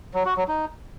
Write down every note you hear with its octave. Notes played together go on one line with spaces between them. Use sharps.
F#3
F#4
F#3
D#4